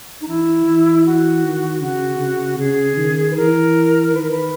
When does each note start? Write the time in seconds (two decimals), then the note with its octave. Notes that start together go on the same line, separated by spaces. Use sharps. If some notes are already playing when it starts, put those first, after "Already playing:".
0.21 D#4
0.28 E3 E4
0.66 E3
1.05 F#4
1.44 D#3
1.81 C#3 F#4
2.20 C#3
2.58 C#3 G#4
2.97 D#3
3.31 B4
3.36 E3 A#4
4.13 D#3 B4
4.22 A#4
4.31 B4